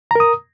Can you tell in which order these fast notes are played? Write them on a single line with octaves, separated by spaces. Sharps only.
A#5 A#4 D#6